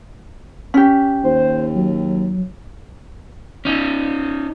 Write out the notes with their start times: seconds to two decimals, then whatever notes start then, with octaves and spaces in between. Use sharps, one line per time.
0.74 C#4 G4
1.24 D#2 C5
1.75 F#3
3.65 C#4 D#4